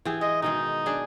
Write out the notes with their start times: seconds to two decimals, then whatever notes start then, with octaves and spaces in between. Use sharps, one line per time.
0.05 E3 G4 G#4
0.21 G#3 D#5
0.42 B2 D#3 G#3 D#4
0.86 D4 G#4 D5